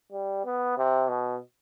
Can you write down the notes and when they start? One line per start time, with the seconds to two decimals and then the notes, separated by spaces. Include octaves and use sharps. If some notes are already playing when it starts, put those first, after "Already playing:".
0.12 G3
0.45 B3
0.78 C3
1.08 B2